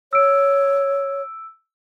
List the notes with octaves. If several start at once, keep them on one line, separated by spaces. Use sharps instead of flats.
C#5 E6 D7